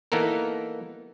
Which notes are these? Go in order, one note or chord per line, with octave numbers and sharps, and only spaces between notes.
E3 A#3 B3 D#4 A4 A#4